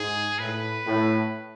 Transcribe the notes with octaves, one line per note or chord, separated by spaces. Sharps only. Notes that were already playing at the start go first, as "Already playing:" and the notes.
Already playing: G#2 G#4
A2 B4
A2